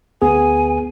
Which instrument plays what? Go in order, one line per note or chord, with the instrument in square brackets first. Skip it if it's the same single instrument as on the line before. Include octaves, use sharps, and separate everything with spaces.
[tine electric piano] D2 B3 G#4 [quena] G#5